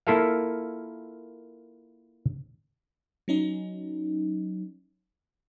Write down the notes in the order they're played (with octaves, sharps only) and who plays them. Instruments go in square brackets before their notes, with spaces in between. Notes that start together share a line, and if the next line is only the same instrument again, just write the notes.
[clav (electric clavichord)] A#3 E4 F4 A4 A#4 F5
[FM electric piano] F#3 C#4 D#4